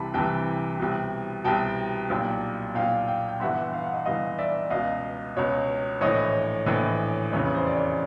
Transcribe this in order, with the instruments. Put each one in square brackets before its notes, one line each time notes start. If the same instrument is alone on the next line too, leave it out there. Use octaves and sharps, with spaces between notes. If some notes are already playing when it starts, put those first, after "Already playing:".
Already playing: [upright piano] C2 C3 E3 A5 B5
C2 C3 E3 G5 A5
C2 B2
C2 B2 G5 A5
B1 A#2
B1 A#2 F5 G5
F5 G5
G5
G1 G2 E3 E5 F#5
F5
F#5
D#5 F5
G1 G2 E3 D#5 F5
D5 E5
C#2 B2 D#5 F5
C#2 B2 C#5
A#1 A2 E3 C#5 D#5
A#1 A2 E3
F1 E2 C#3 E3 C#5
C5
D5
C#5